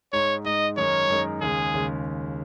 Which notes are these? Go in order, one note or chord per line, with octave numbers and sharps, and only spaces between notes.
G#2 G#3 D#4 C#5
G#2 G#3 D#4 D#5
F#2 D#3 G#3 D#4 A#4 C#5
F#2 D#3 G#3 D#4 A#4
D#2 C#3 G#3 G#4
D#2 C#3 G#3